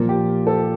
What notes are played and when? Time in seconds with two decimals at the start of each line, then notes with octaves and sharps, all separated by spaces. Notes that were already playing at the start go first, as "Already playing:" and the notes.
Already playing: A#2 F3 A#3 F4
0.09 G4
0.47 A4